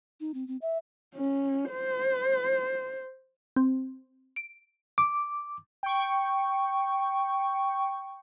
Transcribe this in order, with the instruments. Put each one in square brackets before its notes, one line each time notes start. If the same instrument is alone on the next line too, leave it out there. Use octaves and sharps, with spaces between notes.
[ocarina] D#4
C4
C4
E5
[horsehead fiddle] C#4
C5
[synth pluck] C4
D7
[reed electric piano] D6
[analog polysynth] G5 C#6